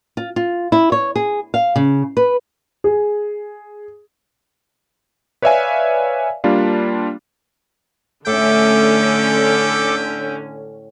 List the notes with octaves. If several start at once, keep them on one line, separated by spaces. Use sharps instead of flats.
F4
F4
E4
C#5
G#4
F5
C#3
B4
G#4
B4 C#5 D5 E5 F5 G#5
G3 A#3 D4 F4
A2 D3 C#4 A4 E5 G5 D6